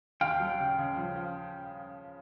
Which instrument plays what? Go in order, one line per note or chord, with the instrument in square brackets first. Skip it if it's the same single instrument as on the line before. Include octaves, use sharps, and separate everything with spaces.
[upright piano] D#2 [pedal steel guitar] F5 G5
[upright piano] F#3
C#3
C#3
F3
F3